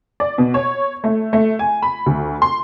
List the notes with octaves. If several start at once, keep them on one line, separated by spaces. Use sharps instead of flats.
D5
B2
C#5
A3
A3
G#5
B5
D2
C6